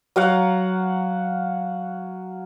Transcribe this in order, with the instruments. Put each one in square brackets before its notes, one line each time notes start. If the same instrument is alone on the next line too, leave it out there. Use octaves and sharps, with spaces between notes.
[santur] F#3 F5 F#5